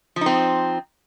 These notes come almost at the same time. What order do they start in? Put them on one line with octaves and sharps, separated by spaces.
F3 D#4 C4